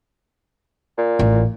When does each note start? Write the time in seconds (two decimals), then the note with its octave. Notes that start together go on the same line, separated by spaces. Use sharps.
0.98 A#2
1.19 A1